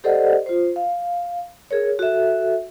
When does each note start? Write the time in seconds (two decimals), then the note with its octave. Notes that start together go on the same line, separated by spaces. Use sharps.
0.04 G4 A4 C5 D5 D#5 F#5
0.46 F4 C5
0.76 F5
1.71 G#4 A#4 C#5
1.99 F#4 A4 E5